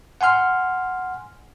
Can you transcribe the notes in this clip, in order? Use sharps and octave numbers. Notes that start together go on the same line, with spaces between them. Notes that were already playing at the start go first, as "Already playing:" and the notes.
F#5 G#5 C6 F6